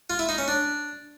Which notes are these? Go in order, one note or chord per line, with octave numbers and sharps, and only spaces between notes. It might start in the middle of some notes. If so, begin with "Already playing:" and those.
F4
E4
D#4
C#4
D4